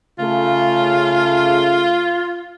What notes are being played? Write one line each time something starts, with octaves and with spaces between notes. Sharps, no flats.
C#3 A3 F4